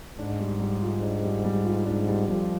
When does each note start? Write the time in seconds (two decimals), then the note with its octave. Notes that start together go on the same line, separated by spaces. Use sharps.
0.18 G#2 D4
0.39 G3
0.60 G3
0.82 F4
1.02 D4
1.23 G3
1.44 G3
1.65 F4
1.85 G#2 D4
2.07 G3
2.28 F2 F3 G3